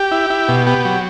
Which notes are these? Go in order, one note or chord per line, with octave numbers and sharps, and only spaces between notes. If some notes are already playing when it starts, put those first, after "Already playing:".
Already playing: G4
E4
E4
B2
B3 G4
F#3